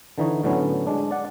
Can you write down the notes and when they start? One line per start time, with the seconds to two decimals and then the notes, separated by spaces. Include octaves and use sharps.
0.18 D3 E3 D#4 C#5
0.44 A2 D3 F#3 B3 C#4
0.87 G#3 D4
1.11 D5 F#5